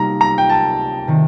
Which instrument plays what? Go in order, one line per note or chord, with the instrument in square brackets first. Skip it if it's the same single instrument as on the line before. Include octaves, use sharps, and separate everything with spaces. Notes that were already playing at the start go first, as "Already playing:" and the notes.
Already playing: [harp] C3 G3 A#3 D#4 [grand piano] A#5
[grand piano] A#5
G5
A5
[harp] C3 D#3